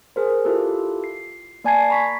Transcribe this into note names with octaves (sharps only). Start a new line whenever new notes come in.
G#4 A#4 C5
E4 F4 G4 A4
C7
A#3 D5 G#5 A5 G#6 C7
A#5 B5 C#6 B6